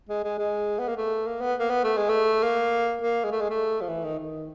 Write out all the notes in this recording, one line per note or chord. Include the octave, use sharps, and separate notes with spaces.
G#3
G#3
G#3
B3
A#3
A3
A#3
B3
A#3
B3
A3
G#3
A3
A#3
A#3
G#3
A3
G#3
A3
F3
E3
D#3
D#3